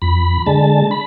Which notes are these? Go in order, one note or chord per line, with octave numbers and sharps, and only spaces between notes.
F2 B5
D3 G#3 A5
B5